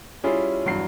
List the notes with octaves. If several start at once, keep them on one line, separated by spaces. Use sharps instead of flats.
G3 C#4 E4 F4 G#4
E2 G2 F#3 C7